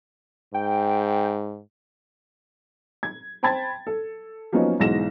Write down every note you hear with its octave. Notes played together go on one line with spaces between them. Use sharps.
G#2 G5
G#6
C5 G5 A5 B5 G#6 A6
A4
F3 F#3 A#3 B3 C#4 D#4
B1 G#2 E3 A#6 E7